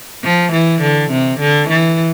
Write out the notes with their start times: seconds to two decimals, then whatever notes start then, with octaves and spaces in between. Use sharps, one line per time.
0.24 F3
0.53 E3
0.82 D3
1.11 C3
1.40 D3
1.69 E3